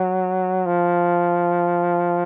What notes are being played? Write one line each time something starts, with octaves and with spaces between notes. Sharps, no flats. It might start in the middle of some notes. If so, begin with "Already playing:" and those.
Already playing: F#3
F3